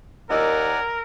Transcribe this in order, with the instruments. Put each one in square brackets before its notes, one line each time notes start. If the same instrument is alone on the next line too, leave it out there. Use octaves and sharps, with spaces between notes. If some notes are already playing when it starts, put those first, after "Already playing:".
[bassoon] D#2 [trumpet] A#4 [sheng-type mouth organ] D5 F#5 G#5 [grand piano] D#5 E6